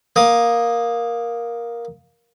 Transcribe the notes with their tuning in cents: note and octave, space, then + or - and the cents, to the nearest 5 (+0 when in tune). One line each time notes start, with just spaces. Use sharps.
A#3 +10 D#6 +0